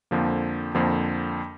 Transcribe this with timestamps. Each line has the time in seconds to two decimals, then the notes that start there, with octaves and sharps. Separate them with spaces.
0.11 F2 D3 F3 A#3
0.75 F2 D3 F3 A#3